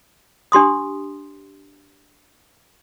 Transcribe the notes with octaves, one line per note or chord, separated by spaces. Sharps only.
D4 G4 C6 D#6